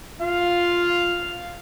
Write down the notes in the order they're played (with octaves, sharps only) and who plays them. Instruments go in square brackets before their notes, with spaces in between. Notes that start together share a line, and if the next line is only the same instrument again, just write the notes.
[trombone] F4 [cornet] F5